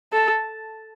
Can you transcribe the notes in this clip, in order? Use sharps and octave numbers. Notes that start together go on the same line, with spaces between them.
A4